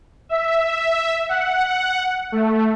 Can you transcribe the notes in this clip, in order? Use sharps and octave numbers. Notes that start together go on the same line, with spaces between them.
E5
F#5
A3